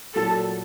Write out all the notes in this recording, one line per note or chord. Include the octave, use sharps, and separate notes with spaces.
A#2 F#3 A4